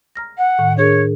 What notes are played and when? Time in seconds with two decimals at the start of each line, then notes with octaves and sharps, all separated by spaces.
0.16 A#5 F6 A#6
0.38 F#5
0.59 A2 D#3
0.77 D4 G#4 A#4 C#5